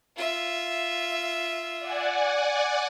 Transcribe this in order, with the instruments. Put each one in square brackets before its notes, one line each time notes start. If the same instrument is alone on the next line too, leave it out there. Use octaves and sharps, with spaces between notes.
[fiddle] F4 E5
[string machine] D5 F#5 G#5